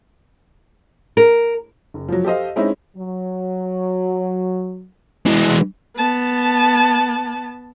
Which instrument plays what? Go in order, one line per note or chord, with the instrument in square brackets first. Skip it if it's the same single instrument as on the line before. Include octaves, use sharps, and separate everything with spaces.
[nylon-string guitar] A#4
[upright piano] F#1
F3 F#3
G4 A4 C5 D#5 F5
G#3 C4 C#4 D#4 E4
[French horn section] F#3
[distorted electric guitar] E3 G#3
[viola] B3 A5